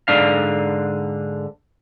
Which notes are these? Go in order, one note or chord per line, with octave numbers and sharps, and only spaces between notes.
G#2 D3 D4 F5